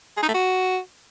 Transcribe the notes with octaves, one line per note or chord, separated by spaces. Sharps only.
G#4
D#4
A3
F#4